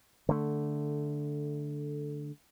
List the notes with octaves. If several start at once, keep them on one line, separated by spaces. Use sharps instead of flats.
D3 A3